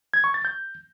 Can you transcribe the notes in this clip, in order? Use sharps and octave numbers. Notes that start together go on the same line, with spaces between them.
G#6
C#6
A6
G6